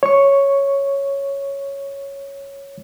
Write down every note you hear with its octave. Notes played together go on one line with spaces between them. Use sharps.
C#5 C#6